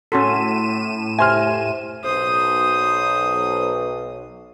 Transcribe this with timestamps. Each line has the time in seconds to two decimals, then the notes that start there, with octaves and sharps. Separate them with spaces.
0.12 A2 C#4 F#4 A4 C6 B6 D#7 E7
1.19 G4 C5 E5 G#5 C6 F6
2.05 B1 C5 D#6